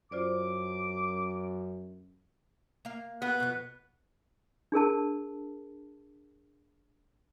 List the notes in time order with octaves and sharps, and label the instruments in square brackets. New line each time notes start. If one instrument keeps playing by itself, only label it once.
[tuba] F#2 [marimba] F4 C5 D5 [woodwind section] D6
[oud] A#3 F5
[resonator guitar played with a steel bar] B3 [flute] F#6
[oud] F2 B2
[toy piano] D4 G#4 A#4 A5